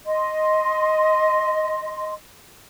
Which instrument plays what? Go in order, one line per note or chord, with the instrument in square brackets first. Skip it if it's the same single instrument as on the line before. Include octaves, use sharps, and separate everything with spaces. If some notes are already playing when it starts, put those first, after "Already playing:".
[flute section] D#5 C6